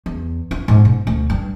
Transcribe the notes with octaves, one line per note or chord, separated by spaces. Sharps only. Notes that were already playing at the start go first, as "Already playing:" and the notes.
E2
F4
G#2
B2
D2
G2